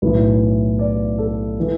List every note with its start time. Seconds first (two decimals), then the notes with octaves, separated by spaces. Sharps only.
0.02 B1 A2 E3 B4
0.79 D5
1.18 A4
1.60 E3